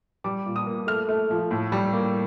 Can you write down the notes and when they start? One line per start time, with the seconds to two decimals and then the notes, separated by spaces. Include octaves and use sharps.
0.24 G3 D6
0.46 A#2
0.56 D#6
0.66 A#3
0.87 A3 F6
1.09 A3
1.30 F3
1.51 A2
1.72 G3
1.93 A#3